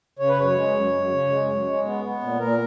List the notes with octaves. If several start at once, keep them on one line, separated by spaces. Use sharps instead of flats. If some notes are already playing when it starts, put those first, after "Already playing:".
C#3 C#5
B4
F#2 C#5
G#3
F#2
F#2
C#3
G#3
F#2
G#3
B3
B3
A#2
A#2 A#4